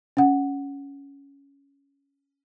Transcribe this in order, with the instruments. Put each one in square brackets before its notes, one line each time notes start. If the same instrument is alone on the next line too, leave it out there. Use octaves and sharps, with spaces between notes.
[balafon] C#4 F#5